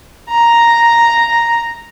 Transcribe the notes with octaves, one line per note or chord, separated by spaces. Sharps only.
A#5